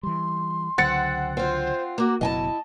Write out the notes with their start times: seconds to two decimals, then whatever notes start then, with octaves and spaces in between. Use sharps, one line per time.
0.03 E3 G3 C6
0.78 C#2 D3 F#3 C4 F#5 A6 C#7
1.37 C4 F4 C5
1.98 A#3 F#4 D6
2.21 F#1 B2 F#3 E4 D#5 G#5 A5